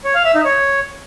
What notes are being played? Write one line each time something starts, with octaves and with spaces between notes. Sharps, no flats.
C#5
F5
E5
D#4
C#5